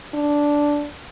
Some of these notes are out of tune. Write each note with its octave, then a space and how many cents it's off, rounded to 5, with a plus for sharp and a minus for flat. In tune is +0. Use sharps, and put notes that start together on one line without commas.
D4 -5